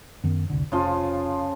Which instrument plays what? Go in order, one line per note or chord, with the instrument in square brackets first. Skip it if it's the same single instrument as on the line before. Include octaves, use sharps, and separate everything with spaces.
[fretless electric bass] F#2 D#3 B3
F1 C2 D3
[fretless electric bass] F1 [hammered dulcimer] C#3 F3 F4